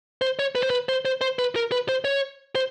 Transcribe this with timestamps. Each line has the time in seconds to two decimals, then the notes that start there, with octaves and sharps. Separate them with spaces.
0.22 C5
0.39 C#5
0.55 B4
0.63 C5
0.70 B4
0.89 C5
1.05 C5
1.21 C5
1.39 B4
1.56 A#4
1.72 B4
1.89 C5
2.05 C#5
2.55 C5